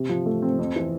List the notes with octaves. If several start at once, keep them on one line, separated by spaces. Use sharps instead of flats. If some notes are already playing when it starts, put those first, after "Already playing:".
Already playing: C3
F3
A3
C4
F2
E3